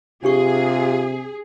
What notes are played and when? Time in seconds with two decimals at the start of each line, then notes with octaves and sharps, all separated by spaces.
0.24 C3 D4 F4 G4 G#4 C#6